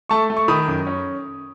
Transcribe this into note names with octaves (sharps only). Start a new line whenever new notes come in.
A3 A5 C#6
A3
C#6
D#3 B5 D#6
F#2
C#4